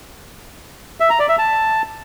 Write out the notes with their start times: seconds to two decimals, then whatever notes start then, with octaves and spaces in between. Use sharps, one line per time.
1.00 E5
1.10 A#5
1.19 D5
1.29 E5
1.38 A5